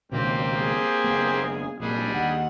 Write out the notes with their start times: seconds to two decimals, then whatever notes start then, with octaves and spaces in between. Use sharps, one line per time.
0.12 C#2 B2 D#3 A#3 C4 G4
0.58 G#4
1.04 F#1 B3
1.80 C2 A#2 G3 D4 G#4
2.14 D#2 F#5